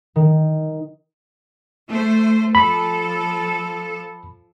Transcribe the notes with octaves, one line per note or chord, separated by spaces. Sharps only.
D#3
A3 C5
F3 A4 B5